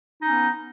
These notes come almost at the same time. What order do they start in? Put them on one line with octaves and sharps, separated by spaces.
D#4 C#4 B3